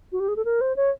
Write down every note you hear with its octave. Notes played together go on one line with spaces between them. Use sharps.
F#4
G4
G#4
A4
A#4
C5
C#5